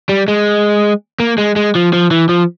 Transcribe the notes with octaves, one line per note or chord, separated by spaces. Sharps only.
G3
G#3
A#3
G#3
G#3
F3
F3
E3
F3